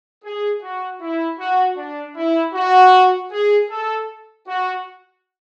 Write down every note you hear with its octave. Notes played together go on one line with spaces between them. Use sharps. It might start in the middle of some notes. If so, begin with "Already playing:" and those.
G#4
F#4
E4
F#4
D4
E4
F#4
G#4
A4
F#4